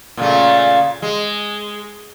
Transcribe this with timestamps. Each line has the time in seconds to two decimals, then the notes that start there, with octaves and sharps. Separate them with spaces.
0.17 A#2 C#3 A3
1.02 G#3